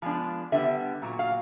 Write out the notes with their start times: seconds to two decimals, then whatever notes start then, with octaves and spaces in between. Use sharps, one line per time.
0.02 F3 G#3 B3 D4
0.52 D3 G3 B3 E5
1.02 A#2 F#3
1.19 F5